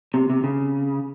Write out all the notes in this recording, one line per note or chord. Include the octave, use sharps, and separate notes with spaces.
C3
C3
C#3